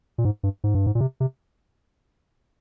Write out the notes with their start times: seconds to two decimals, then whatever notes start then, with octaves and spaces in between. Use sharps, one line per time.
0.18 A#2
0.25 G#2
0.43 G2
0.64 G#2
0.75 G2
0.86 G#2
0.95 A#2
1.01 C3
1.20 C3